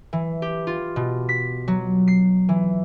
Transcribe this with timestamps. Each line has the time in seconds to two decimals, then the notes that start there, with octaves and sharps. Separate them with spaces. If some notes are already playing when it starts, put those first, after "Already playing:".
0.13 E3
0.42 G4
0.67 F4
0.96 B2
1.29 B6
1.68 F#3
2.08 C7
2.49 E3